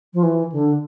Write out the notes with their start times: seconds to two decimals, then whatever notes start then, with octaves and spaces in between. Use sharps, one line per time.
0.13 F3
0.23 E3
0.51 D3